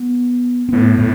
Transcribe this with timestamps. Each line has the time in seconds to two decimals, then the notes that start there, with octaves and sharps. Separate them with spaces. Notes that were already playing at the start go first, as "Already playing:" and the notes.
Already playing: B3
0.69 C4
0.72 A2 B3
0.98 A2